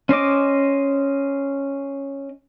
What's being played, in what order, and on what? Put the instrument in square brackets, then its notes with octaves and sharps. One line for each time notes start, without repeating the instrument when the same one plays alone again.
[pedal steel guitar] C#4 C5 D#5 D6